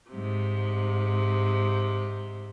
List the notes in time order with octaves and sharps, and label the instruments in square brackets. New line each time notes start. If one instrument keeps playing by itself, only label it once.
[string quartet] G#2 C3